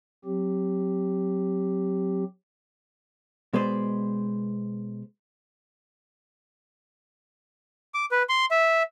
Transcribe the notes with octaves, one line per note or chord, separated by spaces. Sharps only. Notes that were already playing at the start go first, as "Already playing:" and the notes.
F#3 C4 G4
B2 G#3 B4 C5 D5
D6
B4
C6
E5